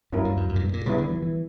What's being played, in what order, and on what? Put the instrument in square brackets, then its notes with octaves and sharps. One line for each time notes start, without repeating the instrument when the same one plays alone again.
[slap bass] G2 [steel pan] F#3 A#3 C#4 E4 A#4
[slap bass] G2
F#2
F#2
A#2
G2
A#2
[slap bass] C#3 [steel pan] G3 B3 E4
[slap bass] D3
E3
E3